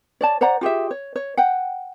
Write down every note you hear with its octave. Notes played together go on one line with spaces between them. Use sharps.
C#5 D5 A5
C5 D5 F#5 A#5
F4 G4 G#4 E5
C#5
C#5
F#5 G5